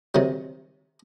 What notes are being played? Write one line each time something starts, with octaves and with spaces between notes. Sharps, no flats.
C3 D#3 F#3